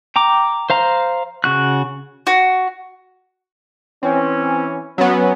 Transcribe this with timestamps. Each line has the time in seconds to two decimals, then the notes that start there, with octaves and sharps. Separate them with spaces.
0.16 G5 A#5 D6
0.70 C5 F5 A#5
1.44 C#3 F#4 F#6
2.27 F#4
4.03 E3 C4 C#4
4.98 F#3 B3 C#4